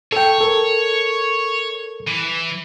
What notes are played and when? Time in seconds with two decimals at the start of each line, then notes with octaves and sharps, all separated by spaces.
0.12 A4 C#5 G5
0.41 A4 A#4
2.07 E3